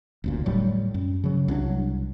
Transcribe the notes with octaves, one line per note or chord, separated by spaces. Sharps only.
F1 D2 A#2
A2 F#3 G3
F#2
C#3 F#3
C2 F#3 D4